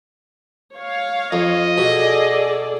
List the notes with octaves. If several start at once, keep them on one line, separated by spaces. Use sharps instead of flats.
C#5 F5
F2 D#5
B2 G#4 A4 D5